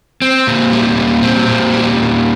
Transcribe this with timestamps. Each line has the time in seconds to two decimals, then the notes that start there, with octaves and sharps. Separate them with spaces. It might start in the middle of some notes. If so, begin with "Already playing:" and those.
0.22 C4
0.47 A#2
0.73 G3
0.97 A#2
1.22 C4
1.48 A#2
1.74 G3
1.98 A#2